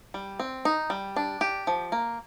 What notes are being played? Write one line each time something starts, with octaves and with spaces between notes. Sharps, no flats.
G3
C4
D#4
G3
D4
G4
F3
A#3